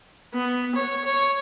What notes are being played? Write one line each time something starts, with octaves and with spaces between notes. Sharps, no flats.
B3
C#5
C#5